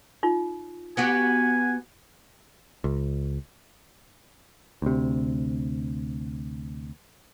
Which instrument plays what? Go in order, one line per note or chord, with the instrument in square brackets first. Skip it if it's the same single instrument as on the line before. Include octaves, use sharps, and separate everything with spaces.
[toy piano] D#4 F4
[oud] B3 F#4 G4 [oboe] G#5
[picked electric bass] C#2
D2 C3